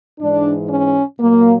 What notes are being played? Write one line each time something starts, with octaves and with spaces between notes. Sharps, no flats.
G#2 E3 G#3 D4
C#4
A#2 F#3 A#3